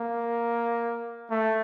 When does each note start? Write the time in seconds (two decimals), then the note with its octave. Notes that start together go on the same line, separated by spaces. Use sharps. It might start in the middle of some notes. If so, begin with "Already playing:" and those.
Already playing: A#3
1.31 A3